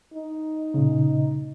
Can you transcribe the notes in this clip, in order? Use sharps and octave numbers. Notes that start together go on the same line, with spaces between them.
D#4
A#2 C#3